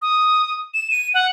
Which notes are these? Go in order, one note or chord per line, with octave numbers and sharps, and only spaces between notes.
D#6
E7
D#7
F#5